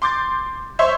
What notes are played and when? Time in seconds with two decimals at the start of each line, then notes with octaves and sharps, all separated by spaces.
0.02 C6 D6 G6 A6
0.79 C5 C#5 E5 C6 C#6